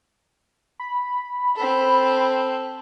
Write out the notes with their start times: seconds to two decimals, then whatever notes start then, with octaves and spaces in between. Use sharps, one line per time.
0.80 B5
1.56 C4 A4